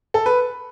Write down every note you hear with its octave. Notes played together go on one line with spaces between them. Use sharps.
A4
B4